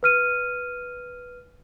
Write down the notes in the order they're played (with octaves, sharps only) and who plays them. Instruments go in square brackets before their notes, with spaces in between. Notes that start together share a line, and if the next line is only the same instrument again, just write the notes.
[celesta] B4 F6 D#7